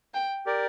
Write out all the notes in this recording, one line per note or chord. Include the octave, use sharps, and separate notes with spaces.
G5
G4 A#4 D5